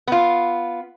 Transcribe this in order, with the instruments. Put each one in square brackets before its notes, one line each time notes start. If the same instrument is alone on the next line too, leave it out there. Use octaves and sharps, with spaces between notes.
[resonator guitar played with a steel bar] B3 F4